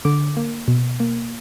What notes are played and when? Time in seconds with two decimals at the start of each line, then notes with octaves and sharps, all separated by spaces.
0.05 D3 D6
0.37 A#3
0.68 B2
1.00 A#3